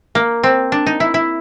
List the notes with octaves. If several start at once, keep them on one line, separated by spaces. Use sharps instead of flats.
A#3
C4
D4
D#4
E4
E4